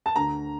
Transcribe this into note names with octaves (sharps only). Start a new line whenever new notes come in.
A5
D2 A#5